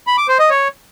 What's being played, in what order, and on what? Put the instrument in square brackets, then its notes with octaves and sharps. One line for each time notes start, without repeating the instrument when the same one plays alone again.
[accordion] B5
D6
C5
D#5
C#5